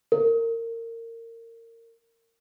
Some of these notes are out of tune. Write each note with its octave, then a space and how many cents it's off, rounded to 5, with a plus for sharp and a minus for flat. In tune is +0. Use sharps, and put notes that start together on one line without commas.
A#4 -25